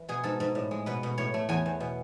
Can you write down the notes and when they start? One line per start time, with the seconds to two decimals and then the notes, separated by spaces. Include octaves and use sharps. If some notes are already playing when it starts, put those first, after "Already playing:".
Already playing: E3
0.09 B2 G#4
0.23 G#2 A4
0.40 G#2
0.55 A2
0.71 G#3
0.86 B2 B4
1.03 B2
1.18 A2 C#5
1.34 A3
1.49 E2 G#5
1.66 E2
1.80 B2